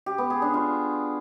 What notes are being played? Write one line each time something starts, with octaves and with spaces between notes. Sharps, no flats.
G4
B3
G#4
D4
F4